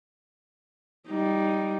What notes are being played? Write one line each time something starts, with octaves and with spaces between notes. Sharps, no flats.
G3 D#4